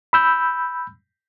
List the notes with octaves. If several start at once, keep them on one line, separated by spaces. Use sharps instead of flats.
B5 E6 G6